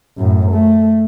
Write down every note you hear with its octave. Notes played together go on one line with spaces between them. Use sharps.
F#2 A2
A3